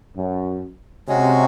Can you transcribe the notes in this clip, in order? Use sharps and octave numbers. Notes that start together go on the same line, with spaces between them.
F#2
C3 G#3 C#4 F#4 C#5